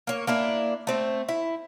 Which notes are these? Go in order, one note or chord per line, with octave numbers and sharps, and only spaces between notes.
A#3 C#5
A#3 D4 E4
A3 C4
E4